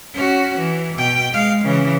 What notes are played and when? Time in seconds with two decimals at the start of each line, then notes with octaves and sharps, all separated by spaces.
0.14 C#4 F#4
0.58 E3
0.97 B2 G5
1.33 G#3 F5
1.64 C#3 E3